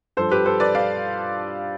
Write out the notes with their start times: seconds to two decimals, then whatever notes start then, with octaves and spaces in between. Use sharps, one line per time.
0.17 G2 F3 A4 C5
0.31 G4 B4
0.46 A4 C5
0.60 B4 D5
0.75 D5 F5